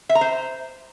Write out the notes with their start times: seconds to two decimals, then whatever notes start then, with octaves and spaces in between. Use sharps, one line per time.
0.09 E5
0.15 A#5
0.21 C5